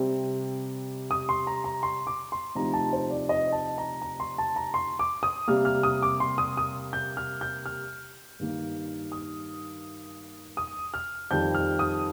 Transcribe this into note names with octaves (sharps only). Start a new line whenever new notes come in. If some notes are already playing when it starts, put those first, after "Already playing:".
Already playing: C3 G3 C4
D#6
C6
A#5
A#5
C6
D6
C6
D2 C3 F3 C4 D#4 A#5
A5
C5
D5
D#5
A5
A#5
A#5
C6
A5
A#5
C6
D6
D#6
C3 G3 A#3 F6
F6
D#6
D6
C6
D#6
D#6
G6
F6
G6
F6
G2 D#3 A#3
D#6
D#6
F6
F2 D#3 G3 G6
F6
D#6